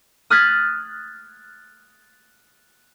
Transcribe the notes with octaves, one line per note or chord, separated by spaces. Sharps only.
D#6 F6 F#6 G#6 A6 B6